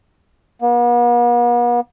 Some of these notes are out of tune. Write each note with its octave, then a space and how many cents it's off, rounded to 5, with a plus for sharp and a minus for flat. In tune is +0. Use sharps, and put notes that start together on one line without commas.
B3 -45